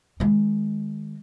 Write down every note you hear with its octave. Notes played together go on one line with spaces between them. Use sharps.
D#3 G#3